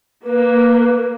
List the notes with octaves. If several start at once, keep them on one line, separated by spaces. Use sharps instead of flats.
A#3 B4